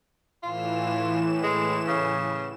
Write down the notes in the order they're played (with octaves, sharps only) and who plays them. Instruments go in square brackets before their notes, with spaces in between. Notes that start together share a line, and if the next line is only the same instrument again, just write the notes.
[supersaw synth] A2 E3 E7 [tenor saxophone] F4
[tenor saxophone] G#3
C#3